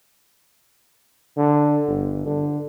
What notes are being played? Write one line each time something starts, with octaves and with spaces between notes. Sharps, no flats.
D3
G1
D3